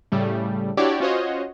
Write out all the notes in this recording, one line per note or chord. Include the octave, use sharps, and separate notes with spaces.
A2 C#3 G3 A3
D4 E4 F#4 G4 C#5 D5
C#4 F4 F#4 C5 C#5 D#5